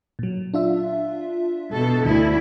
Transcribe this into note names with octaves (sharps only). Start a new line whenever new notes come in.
A#2 F#3
D4 F4 E5
B2 A4
D2 D3 E4